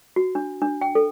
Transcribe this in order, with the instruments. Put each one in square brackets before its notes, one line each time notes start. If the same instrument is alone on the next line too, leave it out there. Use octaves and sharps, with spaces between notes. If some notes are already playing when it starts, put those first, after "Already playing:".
[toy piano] F#4
D4
D4
G5
A4